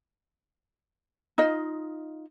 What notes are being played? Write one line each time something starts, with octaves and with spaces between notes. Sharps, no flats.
D#4 F4 D#5